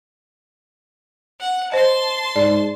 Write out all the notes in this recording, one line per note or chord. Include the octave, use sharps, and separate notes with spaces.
F#5
C5 D#5 A5 C6
G#2 D5